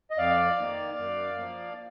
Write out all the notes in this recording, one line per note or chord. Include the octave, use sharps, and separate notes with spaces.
D#5
F2 D5 F5
D#3 A#3
F#2
F3 A#3